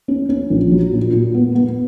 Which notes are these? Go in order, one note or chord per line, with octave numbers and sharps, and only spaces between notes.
C#4
C#4
A#1
F#3
A#2
A#2
B3
B3